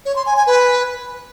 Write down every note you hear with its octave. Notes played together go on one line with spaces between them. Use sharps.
C#5
C6
G#5
G#5
B4